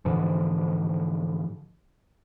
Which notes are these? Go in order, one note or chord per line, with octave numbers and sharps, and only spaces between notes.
G#2 D3 E3 F3